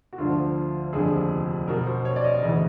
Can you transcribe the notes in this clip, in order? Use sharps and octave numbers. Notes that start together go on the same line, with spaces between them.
F#4
D2 D3 F3 F4
F1 D#2 D3 F3 G#4
B1 B2 A#4
C5
C#5
D5
D#5
D2 C#3 E3 D#5